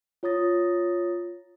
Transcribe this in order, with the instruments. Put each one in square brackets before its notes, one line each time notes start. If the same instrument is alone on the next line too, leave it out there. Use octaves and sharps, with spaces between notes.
[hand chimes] F4 C#5 A#5 D#6 A6 A#6